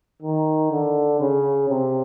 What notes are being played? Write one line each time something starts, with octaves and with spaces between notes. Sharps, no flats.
D#3
D3
C#3
C3